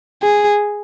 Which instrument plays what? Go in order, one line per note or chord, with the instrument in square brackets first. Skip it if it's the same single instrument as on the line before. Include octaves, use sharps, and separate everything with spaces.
[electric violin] G#4